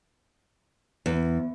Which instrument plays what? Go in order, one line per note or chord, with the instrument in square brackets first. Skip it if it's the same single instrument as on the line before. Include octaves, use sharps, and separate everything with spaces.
[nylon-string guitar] E2